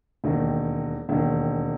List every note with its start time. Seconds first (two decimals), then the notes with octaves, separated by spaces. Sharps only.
0.24 E1 D#2 D#3
1.09 E1 D#2 D#3